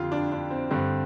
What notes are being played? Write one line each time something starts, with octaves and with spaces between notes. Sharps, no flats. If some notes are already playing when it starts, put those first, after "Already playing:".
Already playing: F2 D3 F4 G4
D4
D4
C4
G2 D3 C4